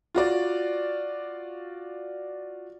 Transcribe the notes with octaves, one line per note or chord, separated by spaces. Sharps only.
F4 F#4 D5